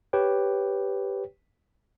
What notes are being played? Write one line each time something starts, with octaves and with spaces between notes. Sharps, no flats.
G4 B4 C#5 G5